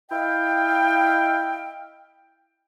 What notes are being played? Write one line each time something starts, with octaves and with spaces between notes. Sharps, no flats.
E4 D#5 F5 G5